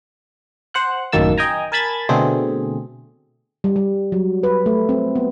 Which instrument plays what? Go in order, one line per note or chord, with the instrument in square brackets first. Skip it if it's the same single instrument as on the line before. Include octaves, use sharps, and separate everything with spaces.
[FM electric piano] C5 F#5 F#6
A1 F#2 D#3 A#3 A5 E6
D#5 G5 G#5 A#5
A#4 G#5 A5 B5 G#6 A6
B2 D3 A3 C4 G#4
[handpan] G3
G3
F#3
B4
A3
C4
B3